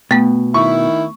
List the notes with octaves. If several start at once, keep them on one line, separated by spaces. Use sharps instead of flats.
B2 A3 B3
D#3 E4 C#6